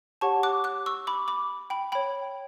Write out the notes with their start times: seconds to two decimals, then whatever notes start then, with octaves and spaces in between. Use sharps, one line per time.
0.21 G4 C#5 F#5 A5 C#6
0.43 D6 F#6
0.64 D6 F#6
0.86 C#6 E6
1.07 B5 D6
1.28 B5 D6
1.70 G5 B5
1.92 C#5 G5 B5